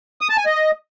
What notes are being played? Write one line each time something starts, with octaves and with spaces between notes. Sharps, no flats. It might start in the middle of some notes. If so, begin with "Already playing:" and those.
D#6
A5
G#5
D#5